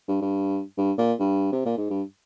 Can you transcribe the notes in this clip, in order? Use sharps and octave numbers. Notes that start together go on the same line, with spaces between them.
G2
G2
G2
A#2
G2
C3
A#2
G#2
G2